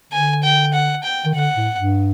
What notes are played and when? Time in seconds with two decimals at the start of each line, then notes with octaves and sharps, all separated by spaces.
0.12 D3 G#5
0.43 G5
0.73 F#5
1.04 G5
1.25 D#3
1.34 D3 F#5
1.55 A2
1.76 G2